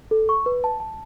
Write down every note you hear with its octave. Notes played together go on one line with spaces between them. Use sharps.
A4
C#6
B4
A5
A5